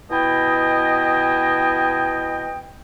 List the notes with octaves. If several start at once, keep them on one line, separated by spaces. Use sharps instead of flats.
B2 E4 D#5 G5